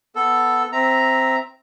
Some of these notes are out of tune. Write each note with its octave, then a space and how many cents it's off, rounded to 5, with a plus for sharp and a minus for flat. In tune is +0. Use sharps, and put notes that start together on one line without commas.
B3 +0 A4 +0
C4 +0 E5 +0 A#5 +0